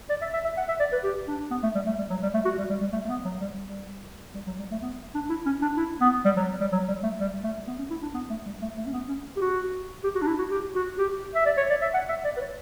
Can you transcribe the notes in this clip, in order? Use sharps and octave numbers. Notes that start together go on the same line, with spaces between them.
D5
E5
E5
E5
F#5
E5
D5
B4
G4
D4
B3
A3
G3
A3
G3
F#3
G3
A3
F#4
G3
G3
G3
A3
A3
B3
F#3
G3
G3
G3
F#3
G3
A3
B3
D4
E4
C#4
D4
E4
B3
G3
F#3
G3
F#3
G3
A3
G3
A3
B3
C#4
E4
D4
B3
A3
G3
A3
A3
C#4
B3
C#4
G4
F#4
G4
F#4
D4
E4
F#4
G4
F#4
G4
E5
D5
C#5
D5
E5
F#5
E5
D5
B4
C#5